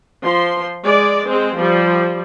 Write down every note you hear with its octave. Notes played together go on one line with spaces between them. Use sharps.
F3 C6
G#3 D5
G#3 C4
F3 G3